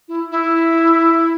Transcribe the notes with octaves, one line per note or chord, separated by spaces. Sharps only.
E4
E4